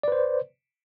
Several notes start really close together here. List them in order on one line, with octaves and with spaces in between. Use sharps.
D5 B4 C5